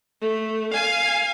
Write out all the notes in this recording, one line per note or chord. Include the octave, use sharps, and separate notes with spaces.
A3
F5 G#5